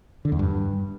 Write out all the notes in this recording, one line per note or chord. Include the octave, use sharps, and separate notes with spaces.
D3
E2
G2